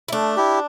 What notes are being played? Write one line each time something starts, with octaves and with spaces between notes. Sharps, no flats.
E4
A3 D4
E4 G4